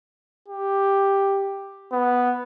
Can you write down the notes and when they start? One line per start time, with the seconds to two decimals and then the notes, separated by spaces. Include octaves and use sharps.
0.49 G4
1.92 B3